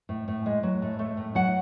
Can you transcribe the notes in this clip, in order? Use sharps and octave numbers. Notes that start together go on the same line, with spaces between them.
A2
A2
G#3
F#3
A2
A3
A2
F#3 F#5